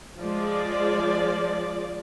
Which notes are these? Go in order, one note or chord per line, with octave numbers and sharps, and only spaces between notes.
F3 G#3 D5